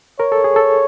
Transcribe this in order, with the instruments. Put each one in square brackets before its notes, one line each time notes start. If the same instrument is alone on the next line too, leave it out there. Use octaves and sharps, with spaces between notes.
[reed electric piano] A#4 [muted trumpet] C#5
[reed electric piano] A4
G#4
A4